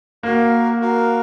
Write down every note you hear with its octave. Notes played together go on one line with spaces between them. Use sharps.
A#3 F#4 A#4 F5
F#4 A#4 F5